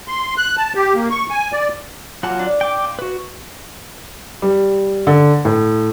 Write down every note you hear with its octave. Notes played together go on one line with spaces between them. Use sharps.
C6
F#6
A5
G4
A#3
C#6
G#5
D5
F#3 A#3 F4 F#5 A5
D4 D5
G5 D6
A#2
F#4 B4
G3
D3
A2